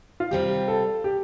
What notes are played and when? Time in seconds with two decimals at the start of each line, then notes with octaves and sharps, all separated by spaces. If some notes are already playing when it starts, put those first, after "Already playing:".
0.20 F4
0.31 C3 G3 C4 F4 G4
0.68 A4
1.04 G4